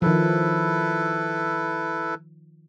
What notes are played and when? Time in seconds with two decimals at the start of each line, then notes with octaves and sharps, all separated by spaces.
0.02 D#3 F3 E4 A4 B4